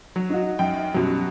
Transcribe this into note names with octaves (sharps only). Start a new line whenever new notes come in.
F#3
D#4 F#4
F#2 G5
F#2 B2 F#3 G3